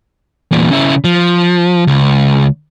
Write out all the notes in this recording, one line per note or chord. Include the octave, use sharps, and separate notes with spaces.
E2 A#2
C#3 E4
F3
C#2